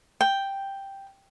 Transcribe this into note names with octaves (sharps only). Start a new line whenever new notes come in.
G5